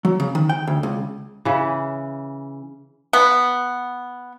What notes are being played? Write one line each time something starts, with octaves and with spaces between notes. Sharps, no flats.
F#3
C#3
D#3
G5
D2
C#2
C#3 E3
B3